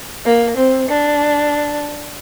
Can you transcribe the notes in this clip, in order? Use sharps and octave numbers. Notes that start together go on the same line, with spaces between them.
A#3
C4
D4